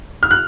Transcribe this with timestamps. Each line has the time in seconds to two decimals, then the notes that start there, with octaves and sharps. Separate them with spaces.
0.23 F6
0.31 F#6